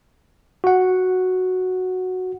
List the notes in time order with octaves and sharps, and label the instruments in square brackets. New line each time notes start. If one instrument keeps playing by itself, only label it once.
[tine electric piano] F#4 F#5